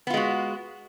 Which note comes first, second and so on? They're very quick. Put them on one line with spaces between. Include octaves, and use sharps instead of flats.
B3 F4 G#3 F#4